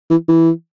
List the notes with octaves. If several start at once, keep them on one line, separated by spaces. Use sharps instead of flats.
E3
E3